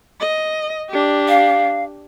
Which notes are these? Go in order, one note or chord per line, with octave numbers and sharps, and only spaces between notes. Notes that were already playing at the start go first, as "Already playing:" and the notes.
D#5
D4 G4
F5